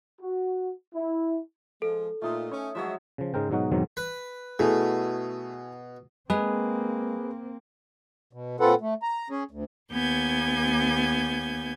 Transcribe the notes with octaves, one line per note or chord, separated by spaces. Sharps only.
F#4
E4
F3 G#3 A4
A#2 A3 D#4 F4
C#4 C#5
F3 F#3 G#3 C#5 E5
C#3 F3
G#2 C#3 G#3 A#4 C5 G5
G#2 B2 F#3 D#4 F#4
E2 G#2 B2 D#3 F#3 C4
B4
B2 A3 E4 G#4
G#3 A#3 C4 G#4 B4
B2
A#2 C4 F4 A4 B4 F#5
A3
A#5
C#4 G#4
D2
D#2 B3 G#5 G6 G#6